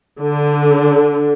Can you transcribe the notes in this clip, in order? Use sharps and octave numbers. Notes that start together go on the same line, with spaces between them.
D3